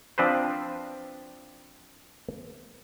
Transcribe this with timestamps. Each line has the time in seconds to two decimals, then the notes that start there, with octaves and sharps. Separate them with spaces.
0.18 F3 C4 D4 B4 C5